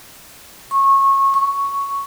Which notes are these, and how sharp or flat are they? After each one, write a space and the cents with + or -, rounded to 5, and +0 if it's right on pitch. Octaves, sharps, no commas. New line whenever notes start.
C#6 -25
C#6 +5